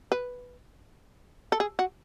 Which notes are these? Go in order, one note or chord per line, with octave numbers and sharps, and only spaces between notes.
B4
A4
G#4
F#4